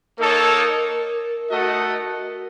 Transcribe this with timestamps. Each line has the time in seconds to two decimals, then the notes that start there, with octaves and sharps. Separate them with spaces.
0.18 A#3 D#4 A4 A#4 C#5
1.50 A3 D#4 F#4 A4 D#5 F#5